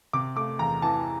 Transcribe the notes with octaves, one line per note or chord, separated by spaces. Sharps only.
C3 D6
A3 D6
E2 A#5
E3 A5